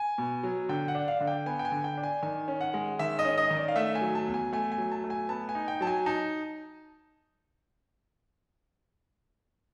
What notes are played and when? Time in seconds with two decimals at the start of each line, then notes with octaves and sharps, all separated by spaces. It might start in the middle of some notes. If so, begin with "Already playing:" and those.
Already playing: G#5
0.18 B2
0.43 F#3
0.69 D3 G5
0.88 F#5
0.95 D4
1.08 F5
1.21 D3
1.27 G5
1.46 B3 G#5
1.59 G5
1.65 G#5
1.72 D3
1.84 G5
1.97 D4
2.03 G#5
2.23 D#3 G#5
2.48 C#4
2.61 F#5
2.74 G#3
2.99 D#3 E5
3.19 D#5
3.25 C#4
3.38 D#5
3.51 D#3
3.57 D5
3.68 F5
3.76 A3 E5
3.95 G#5
4.01 F#3
4.15 A5
4.27 E2
4.34 G#5
4.52 A3 G#5
4.72 G#5
4.78 F#3
4.92 A5
5.04 A3
5.10 G#5
5.29 B3 A5
5.49 G#5
5.55 D#4
5.68 G5
5.81 F#3 A5
5.87 G#5
6.06 D#4 A5